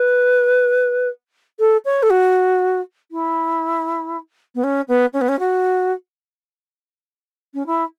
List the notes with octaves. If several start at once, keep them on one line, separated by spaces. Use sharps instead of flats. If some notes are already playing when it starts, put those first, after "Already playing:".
Already playing: B4
A4
C#5
A4
F#4
E4
B3
C#4
B3
C#4
B3
C#4
F#4
C#4
E4